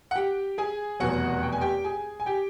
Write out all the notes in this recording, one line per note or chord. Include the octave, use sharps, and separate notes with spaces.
F#5
G4 G5
G#4 G#5
F1 E2 B2 F#3 F#4 F#5
G5
G#5
G4 G5
G#4 G#5
G#5
G4 G5